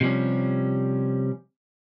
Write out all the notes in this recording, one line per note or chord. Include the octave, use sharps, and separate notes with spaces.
C3 F3 G3 C#4